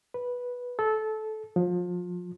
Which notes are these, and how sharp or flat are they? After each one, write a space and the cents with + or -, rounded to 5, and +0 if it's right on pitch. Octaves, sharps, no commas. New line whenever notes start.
B4 -10
A4 -20
F3 +30